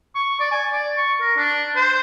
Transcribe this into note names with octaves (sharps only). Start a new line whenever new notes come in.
C#6
D5
G#5
D5
C#6
A#4
D4
C5